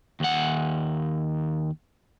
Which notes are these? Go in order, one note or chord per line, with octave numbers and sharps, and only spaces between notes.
D#2 F#5